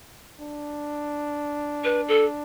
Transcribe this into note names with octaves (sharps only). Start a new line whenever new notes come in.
D4
B4
A4